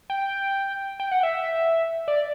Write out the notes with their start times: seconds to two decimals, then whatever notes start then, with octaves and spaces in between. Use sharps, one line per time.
0.10 G5
1.00 G5
1.11 F#5
1.23 E5
2.08 D5